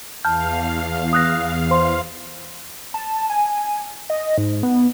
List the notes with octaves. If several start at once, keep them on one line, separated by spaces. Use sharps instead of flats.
E2 F5 A5 F6 G6
D#6 F#6 A#6
C5 C6
A5
G#5
D#5
G#2
B3